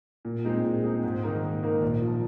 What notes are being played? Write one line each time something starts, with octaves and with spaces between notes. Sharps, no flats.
A#2
G#3 C4 D#4
A#2
G#3 C4 D#4
G#2
D#3 A#3 D#4 A#4
G#2
D#3 A#3 D#4 A#4
A#1
F3